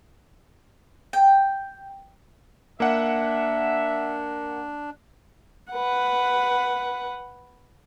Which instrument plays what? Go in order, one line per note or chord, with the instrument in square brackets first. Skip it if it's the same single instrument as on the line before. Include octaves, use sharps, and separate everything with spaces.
[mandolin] G5
[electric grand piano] A#3 F#5 [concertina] D4 [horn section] E5
[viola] B4 F#5